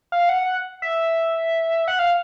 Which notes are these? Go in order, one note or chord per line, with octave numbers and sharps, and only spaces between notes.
F5
F#5
E5
F#5
F5